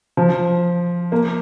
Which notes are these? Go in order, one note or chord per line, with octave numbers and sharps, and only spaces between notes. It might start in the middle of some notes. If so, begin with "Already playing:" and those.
F3
A#3